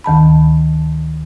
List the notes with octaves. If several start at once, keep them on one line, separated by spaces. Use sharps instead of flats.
D2 D#3 A5 B5